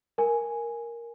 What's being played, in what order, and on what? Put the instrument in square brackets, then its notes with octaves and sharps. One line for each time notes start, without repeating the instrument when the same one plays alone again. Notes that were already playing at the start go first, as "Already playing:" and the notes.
[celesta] A#4 G#5